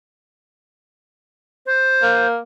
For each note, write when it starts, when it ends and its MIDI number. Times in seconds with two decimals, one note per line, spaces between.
1.66 2.26 72
2.03 2.38 58